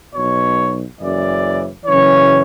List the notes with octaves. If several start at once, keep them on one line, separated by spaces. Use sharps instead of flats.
B1 B2 C#5
F#1 F#2 C#3 E3 D5
F#1 F#2 C#3 E3 C#5